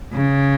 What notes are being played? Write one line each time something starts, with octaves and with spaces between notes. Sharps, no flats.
C#3